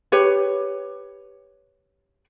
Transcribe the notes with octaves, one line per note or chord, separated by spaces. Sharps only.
G4 B4 C#5